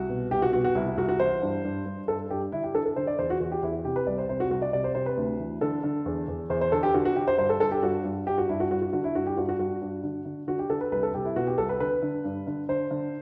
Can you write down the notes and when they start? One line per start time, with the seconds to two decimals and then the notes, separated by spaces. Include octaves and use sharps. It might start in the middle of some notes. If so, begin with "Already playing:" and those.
Already playing: C2 F#4
0.09 B2
0.31 C2 G4
0.42 F#4
0.53 B2 F#4
0.64 F#4
0.75 C2 E4
0.86 E4
0.97 C2 F#4
1.08 F#4
1.20 E3 C5
1.42 G2
1.64 G2
1.86 G2
2.08 G2 A4
2.30 G2 G4
2.52 D3 E4
2.63 G4
2.74 D3 A4
2.86 A4
2.96 D3 C5
3.07 D5
3.19 E2 C5
3.30 F#4
3.40 E2 F#4
3.52 G4
3.62 E2 E4
3.85 C3 G4
3.96 B4
4.07 C2 D5
4.18 C5
4.29 C3 C5
4.40 F#4
4.51 C2 F#4
4.62 D5
4.73 C3 D5
4.84 C5
4.95 C3 C5
5.06 B4
5.17 D2
5.39 E3
5.61 D3 A4
5.84 D3
6.06 E2
6.28 E2
6.50 E2 C5
6.61 C5
6.72 D3 A4
6.83 G4
6.94 D3 F#4
7.05 F#4
7.16 D3 G4
7.28 C5
7.38 G2 C5
7.49 A4
7.60 G2 A4
7.72 G4
7.82 G2 F#4
8.04 G2
8.27 G2 G4
8.38 F#4
8.49 G2 E4
8.60 F#4
8.71 G2 F#4
8.82 F#4
8.93 D3 F#4
9.04 E4
9.15 G2 F#4
9.27 G4
9.37 G2 F#4
9.49 F#4
9.59 G2 F#4
9.82 G2
10.03 D3
10.25 D3
10.48 D3 F#4
10.59 G4
10.70 D3 A4
10.81 B4
10.92 C2 B4
11.03 A4
11.14 C2 G4
11.25 E4
11.36 B2 F#4
11.47 G4
11.58 C2 A4
11.69 B4
11.80 D3 B4
12.02 D3
12.24 G2
12.47 D3
12.69 D3 C5
12.91 D3